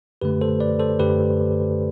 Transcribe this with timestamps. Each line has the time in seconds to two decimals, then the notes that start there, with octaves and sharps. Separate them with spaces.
0.21 F#2 D3 A3 G4 B4
0.41 A4 C5
0.60 B4 D5
0.80 A4 C5
0.99 F#2 D3 A3 G4 B4